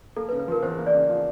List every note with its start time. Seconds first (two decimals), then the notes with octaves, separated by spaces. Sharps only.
0.16 A#3 A4
0.29 B4
0.32 C#3
0.40 B4
0.48 F3 A#4
0.63 E2 C5
0.78 A#3
0.87 D5
0.95 C#3
1.10 F3